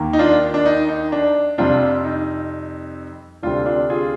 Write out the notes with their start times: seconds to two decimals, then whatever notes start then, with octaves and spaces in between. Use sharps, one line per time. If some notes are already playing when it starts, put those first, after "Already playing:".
Already playing: D#2 D#3 A#3
0.13 D#4
0.19 D4 F4
0.54 D4
0.66 D#4
0.89 D#4
1.12 D4
1.58 F2 C3 G3 C4 D4 F4
2.04 D#4
3.43 D2 C3 G3 C4 D4 F4
3.66 D4 F4
3.90 F4 G#4